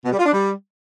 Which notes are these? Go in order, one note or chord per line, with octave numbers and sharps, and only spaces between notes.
B2
G3
F4
D4
G3